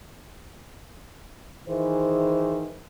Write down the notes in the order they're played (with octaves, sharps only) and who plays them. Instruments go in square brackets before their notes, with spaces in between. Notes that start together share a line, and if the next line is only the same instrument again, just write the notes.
[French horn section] D#3 E3 G#4 C5